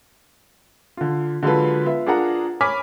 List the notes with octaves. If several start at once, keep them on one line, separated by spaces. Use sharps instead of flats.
D3 F4
D3 F#3 G#3 F4 A4 B4
B3 F4 E5
D4 F4 G#4 A#4 F#5 A#5
C#5 G#5 B5 D6 F6 B6